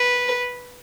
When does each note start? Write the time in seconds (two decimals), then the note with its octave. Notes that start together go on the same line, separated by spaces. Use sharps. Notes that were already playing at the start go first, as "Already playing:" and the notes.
Already playing: B4